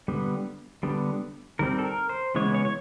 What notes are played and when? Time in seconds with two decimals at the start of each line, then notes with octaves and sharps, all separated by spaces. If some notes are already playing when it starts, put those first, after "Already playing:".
0.08 D3 G3 B3
0.83 D3 G3 B3
1.59 D#3 G3 C4 A#4
1.79 A4
1.85 A#4
2.09 C5
2.35 C#3 E3 G#3 B3 C#5
2.55 C#5
2.65 C#5